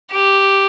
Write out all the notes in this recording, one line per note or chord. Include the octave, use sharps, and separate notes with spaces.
G4